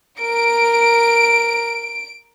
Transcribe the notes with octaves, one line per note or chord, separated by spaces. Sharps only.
A#4 D7